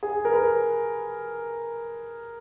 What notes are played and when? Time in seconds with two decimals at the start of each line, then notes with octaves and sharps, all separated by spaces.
0.03 G#4
0.25 A#4
0.32 B4